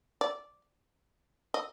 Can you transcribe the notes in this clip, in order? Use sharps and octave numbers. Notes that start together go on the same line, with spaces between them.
D5
D#5